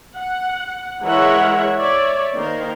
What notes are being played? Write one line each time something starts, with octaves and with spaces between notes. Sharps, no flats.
F#5
E3 G#3 A#4 C#5 E5 F#5
C#5 D5 E5
D#3 A#3 A#4 C5